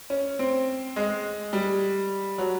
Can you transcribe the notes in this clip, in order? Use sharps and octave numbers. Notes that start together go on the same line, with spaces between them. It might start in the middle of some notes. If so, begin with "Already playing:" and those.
C#4
C4
G#3
G3
F#3